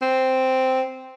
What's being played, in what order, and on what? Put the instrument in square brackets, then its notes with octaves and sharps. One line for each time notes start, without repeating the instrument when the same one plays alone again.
[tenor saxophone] C4